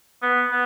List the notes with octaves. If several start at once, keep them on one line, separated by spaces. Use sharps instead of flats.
B3
B3